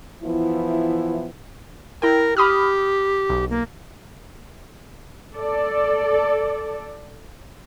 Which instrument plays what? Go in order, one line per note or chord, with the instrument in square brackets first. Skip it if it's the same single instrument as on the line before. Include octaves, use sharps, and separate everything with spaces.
[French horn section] E3 F3 B3 E4
[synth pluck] E4 G5 [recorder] A#4
[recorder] G4 [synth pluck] B5 D#6 F6
[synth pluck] B1
[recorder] A#3
[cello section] A4 D5